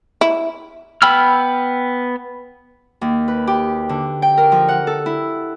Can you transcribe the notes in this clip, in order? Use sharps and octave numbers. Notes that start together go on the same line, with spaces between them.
E4
B3 G5 B5 E6 F6
D#2
B4
G4
D3
G5
A#4
F3
F#5
A4
E4